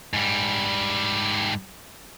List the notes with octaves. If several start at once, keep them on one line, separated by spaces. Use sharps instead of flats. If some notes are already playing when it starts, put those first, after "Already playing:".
G#2 G3